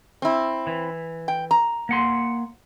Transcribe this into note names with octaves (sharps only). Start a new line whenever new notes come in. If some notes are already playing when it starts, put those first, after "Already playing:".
C4 E4
E3
G5
A#5
A#3 F#5 C6